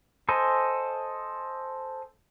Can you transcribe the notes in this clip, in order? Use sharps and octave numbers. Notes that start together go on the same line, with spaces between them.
A4 C5 D#5 G#5